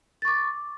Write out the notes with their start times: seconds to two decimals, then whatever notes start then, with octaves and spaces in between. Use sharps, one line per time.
0.22 A6
0.25 C#6
0.28 D6